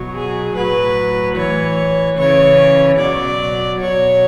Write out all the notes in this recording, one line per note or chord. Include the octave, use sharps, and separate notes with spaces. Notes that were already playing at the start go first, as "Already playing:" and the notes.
Already playing: B2 F#3
G#4
A2 F#3 B4
A2 E3 C#5
C#3 E3 C#5
B2 F#3 D5
B2 F#3 C#5